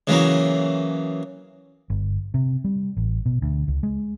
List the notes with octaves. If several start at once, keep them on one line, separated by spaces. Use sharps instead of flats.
C#3 E3 F#3 A#3
G1
C3
G3
A1
B2
D2
C#2
G#3